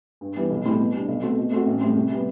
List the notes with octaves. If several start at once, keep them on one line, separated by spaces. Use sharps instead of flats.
G2
E3 G3 B3
B1
A2 G3 C4 E4
B2
G3 D4
B1
B2 A3 C4 F#4
B2
A3 C4 F#4
A1
A2 G3 C4
C2
C3 G3 B3